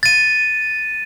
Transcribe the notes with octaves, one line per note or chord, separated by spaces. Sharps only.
A6 D#7